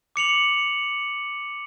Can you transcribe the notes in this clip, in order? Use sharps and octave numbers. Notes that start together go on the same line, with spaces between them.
D6 C#7 F7 F#7